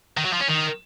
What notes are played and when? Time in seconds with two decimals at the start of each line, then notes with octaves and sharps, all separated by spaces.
0.17 D#3
0.25 F#3
0.33 F3
0.41 C#4
0.49 D#3